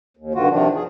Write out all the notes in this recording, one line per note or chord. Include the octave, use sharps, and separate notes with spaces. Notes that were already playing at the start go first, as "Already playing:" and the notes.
D#2
G2 D3 D#3 F4 F#4
C3 D#3 F3 D4
G#4